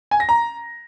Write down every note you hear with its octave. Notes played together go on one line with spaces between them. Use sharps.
G#5
A#6
A#5